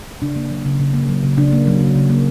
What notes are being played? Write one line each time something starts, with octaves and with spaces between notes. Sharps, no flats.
C#3 D4
A#3
F#3
C#3
C#3
A#3
F#3
C#3
C#3 D4
A#3
F#3
C#3
C#3
A#3